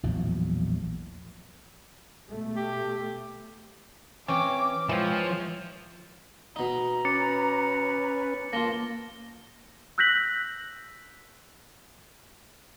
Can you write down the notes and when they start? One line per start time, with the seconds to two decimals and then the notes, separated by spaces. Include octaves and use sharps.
0.03 A#1 E2 A2 F#3
2.27 B2 A3
2.56 G4
4.28 E3 C4 C#4 G5 D6
4.89 E3 F3 G#3 C4 C#5
6.56 B2 D#4 A#5
7.05 C#4 B4 D6 A6 C#7
8.53 A#3 F4 A5 A#6 G7
9.98 E6 F#6 G6 A#6 B6 F#7